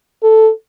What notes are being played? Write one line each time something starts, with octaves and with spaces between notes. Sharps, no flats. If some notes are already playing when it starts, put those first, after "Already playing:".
A4